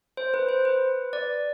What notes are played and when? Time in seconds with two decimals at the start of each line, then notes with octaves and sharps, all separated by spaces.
0.17 C5
0.34 B4
0.49 C5
0.65 B4
1.13 D5